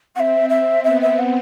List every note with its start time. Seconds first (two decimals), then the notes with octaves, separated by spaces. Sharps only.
0.14 C4 F#5
0.19 E5
0.49 E5
0.84 B3 E5
1.01 E5
1.18 F#5